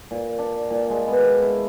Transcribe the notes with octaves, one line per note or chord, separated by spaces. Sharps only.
A#2
D4
A#2
G#3
B3
E4